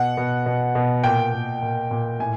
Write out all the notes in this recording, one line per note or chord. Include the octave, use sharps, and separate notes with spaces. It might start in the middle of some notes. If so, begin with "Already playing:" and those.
Already playing: B2 F#5
B2
B2
B2
A#2 G5
A#2
A#2
A#2
A2 G#5